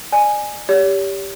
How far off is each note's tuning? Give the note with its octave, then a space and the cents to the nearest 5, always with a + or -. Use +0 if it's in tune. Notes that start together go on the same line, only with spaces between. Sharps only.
D5 +30 G#5 +0
G4 +5 C#5 +40